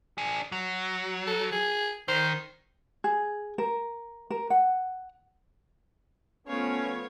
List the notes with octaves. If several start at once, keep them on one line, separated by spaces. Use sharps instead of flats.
D4 G#4
F#3
A4
G#4
D#3 C5
G#4
A#4
A#4
F#5
F3 A3 B3 C#4 C#5 F5